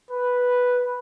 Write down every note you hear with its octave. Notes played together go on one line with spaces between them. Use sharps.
B4